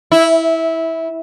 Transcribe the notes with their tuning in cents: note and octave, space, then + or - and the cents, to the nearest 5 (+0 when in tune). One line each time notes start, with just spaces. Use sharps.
E4 -15